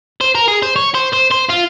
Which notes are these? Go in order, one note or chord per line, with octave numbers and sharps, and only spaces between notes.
C5
A#4
G#4
C5
C#5
C5
C5
C5
F4